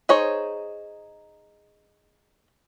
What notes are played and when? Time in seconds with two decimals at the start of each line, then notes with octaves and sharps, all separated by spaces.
0.09 D#4 G#4 C5 C#5